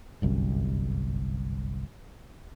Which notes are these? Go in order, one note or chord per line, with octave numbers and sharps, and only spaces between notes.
G1 C2 F#2